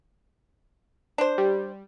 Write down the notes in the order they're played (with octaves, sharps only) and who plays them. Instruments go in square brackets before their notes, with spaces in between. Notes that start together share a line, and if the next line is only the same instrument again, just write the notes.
[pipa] D4 C5
[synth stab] G3